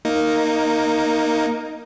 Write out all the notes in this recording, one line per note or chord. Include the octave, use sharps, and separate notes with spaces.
A#3 D#4